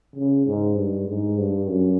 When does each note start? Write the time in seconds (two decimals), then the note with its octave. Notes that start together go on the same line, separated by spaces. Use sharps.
0.16 C#3
0.46 G#2
0.77 G2
1.08 G#2
1.39 G2
1.69 F#2